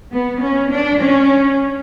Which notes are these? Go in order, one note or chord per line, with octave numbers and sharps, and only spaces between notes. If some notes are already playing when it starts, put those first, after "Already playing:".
B3
C#4
D4
C#4